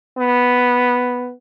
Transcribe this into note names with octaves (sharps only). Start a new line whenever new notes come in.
B3